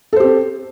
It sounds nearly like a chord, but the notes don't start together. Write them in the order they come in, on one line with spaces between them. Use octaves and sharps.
A4 C5 G4 C4